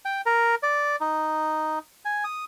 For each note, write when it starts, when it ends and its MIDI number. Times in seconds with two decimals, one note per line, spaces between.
0.05 0.21 79
0.26 0.55 70
0.63 0.96 74
1.01 1.79 63
2.05 2.24 80
2.24 2.45 87